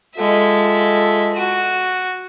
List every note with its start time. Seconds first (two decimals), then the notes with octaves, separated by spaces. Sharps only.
0.17 G#3 F4 A4 E5
1.34 F#4